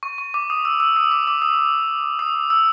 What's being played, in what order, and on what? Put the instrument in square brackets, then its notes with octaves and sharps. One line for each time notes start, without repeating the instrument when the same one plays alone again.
[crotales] C#6
C#6
D6
D#6
E6
E6
D#6
D6
D6
D#6
D#6
E6